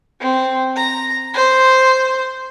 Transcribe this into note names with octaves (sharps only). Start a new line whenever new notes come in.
C4
A#5
C5